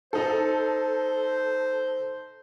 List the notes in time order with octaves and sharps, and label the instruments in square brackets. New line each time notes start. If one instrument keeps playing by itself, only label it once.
[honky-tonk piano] D#4 A4 [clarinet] C5